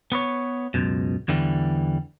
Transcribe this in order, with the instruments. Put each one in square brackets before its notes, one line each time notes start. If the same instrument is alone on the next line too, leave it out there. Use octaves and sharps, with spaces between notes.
[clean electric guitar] B3 B4 C#5
C#2 F#2 B2
E2 D3 E3 G3